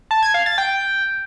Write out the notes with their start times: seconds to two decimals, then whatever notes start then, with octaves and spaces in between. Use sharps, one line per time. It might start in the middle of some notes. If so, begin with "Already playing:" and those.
0.11 A5
0.22 G#6
0.34 F5
0.46 A6
0.58 G5